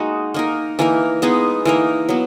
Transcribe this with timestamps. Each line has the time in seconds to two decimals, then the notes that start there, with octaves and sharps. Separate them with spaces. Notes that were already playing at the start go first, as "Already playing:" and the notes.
Already playing: G#3 A#3 D#4 F#4
0.34 A#3 D#4 A#4
0.79 E3 A#3 D#4 A#4
1.22 G#3 B3 D#4 G#4
1.65 E3 A#3 D#4 A#4
2.09 F#3 B3